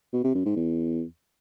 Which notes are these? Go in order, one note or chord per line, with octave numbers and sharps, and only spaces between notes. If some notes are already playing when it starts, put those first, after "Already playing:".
B2
C3
F#2
G#2
E2